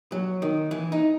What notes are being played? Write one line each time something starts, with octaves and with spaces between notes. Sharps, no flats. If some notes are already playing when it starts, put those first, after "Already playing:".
F#3
D#3
E3
D#4